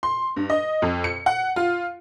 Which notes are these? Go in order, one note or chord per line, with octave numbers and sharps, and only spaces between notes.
C6
G2
D#5
F2
C#7
F#5
F4